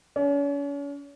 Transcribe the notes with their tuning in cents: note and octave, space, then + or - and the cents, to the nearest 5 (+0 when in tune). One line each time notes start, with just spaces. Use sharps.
C#4 +40